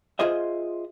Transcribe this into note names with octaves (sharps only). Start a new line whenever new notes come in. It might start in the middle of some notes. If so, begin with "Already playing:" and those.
F4 G#4 C5 D#5 E5